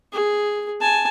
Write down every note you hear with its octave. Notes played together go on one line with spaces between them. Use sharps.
G#4
G#5 A5